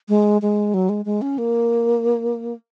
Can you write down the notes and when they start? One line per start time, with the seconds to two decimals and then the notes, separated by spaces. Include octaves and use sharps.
0.09 G#3
0.42 G#3
0.74 F#3
0.89 G#3
1.05 G#3
1.22 C#4
1.38 A#3